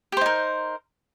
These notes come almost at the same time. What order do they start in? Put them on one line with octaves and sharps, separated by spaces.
G4 C5 D#4 A#4